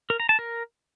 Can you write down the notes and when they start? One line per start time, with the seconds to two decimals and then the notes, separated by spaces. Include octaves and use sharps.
0.10 A#4
0.20 A#5
0.29 A5
0.39 A#4